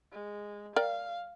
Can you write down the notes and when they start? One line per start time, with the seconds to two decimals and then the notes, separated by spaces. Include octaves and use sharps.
0.13 G#3
0.76 A#4 D5 F5 G5